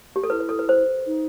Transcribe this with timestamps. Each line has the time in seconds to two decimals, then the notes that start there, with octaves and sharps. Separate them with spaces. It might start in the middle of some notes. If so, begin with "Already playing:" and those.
0.16 G4
0.24 A4
0.30 E4 B4
0.40 B4
0.49 A4
0.59 B4
0.69 C5
1.06 D#4